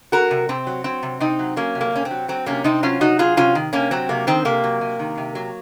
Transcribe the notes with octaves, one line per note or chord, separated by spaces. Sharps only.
F#3 F#4 A#4
C3
C3 C4
F#3
F#3 C4
C3
C3 C4 D#4
F#3
F#3 A#3 C#4
C3
A#3
C3 C#4
C4
F#3
F#3 C4
C3 A#3 C#4
C3 C4 D#4
F#3 C#4 F4
C3 D#4 F#4
F#3 F4 G#4
C3 C#4 F4
D#3
C3 A#3 C#4
F#3 C4
C3 A#3
D#3 C4
C3 A#3
F#3
C3
D#3
C3
F#3